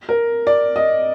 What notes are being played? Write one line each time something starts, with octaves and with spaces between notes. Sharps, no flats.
A#4
D5
D#5